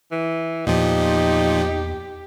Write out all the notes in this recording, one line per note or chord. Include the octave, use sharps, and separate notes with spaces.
E3
E2 A#2 F3 D#4 G4